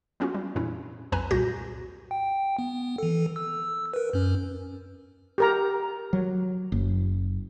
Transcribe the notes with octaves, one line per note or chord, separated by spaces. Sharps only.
F#3 B3 C#4 F4 F#4
G3
F2 A#2 E3 C#4 D4 E4
B1 F2 B4 G#5 A#5 B5
C2 A#2 F#4 G6 A#6
G5
B3
E3 A4
E6
A#4 B4
F#2 C#4
G4 A#4 A#5
F#3
F#1